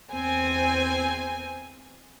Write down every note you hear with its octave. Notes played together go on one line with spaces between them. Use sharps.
E2 C4 G#5